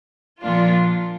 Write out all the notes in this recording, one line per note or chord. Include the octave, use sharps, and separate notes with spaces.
A#2 F3 A#3 D4 F4